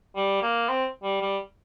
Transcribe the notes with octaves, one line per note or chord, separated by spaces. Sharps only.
G3
A#3
C4
G3
G3